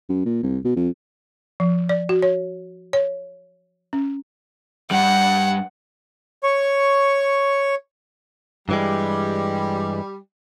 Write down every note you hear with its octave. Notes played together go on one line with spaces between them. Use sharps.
F#2
A#2
C2
B2
F2
F3
D5
F#4
C#5
C#5
C#4
G2 G3 F#5
C#5 C#6
G2 E3 G3 G#3